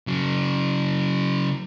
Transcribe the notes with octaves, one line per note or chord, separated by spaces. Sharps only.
C#3 F#3